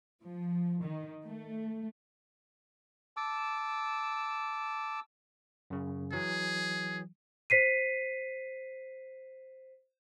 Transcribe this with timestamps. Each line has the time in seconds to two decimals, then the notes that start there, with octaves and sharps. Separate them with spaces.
0.22 F3
0.82 D#3
1.24 A3
3.17 A5 D6 E6
5.70 F#2 C#3
6.12 E3 F#3 G#4
7.50 C5 B6 C7 D#7